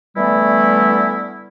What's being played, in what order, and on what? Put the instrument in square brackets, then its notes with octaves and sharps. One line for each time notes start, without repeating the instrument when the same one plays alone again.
[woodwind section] D3 E3 G3 A3 B3 E4